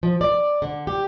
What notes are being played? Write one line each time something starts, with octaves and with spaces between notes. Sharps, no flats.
F3
D5
D3
G4